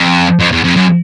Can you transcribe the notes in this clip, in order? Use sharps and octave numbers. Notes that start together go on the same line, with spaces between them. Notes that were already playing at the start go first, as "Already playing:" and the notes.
Already playing: F2
F2
E2
F2
F#2